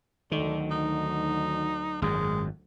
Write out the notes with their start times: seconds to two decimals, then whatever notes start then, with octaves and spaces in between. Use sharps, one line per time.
0.32 D2 D3 D#3 F#3
0.71 D#4
2.02 G#1 F#2 G#3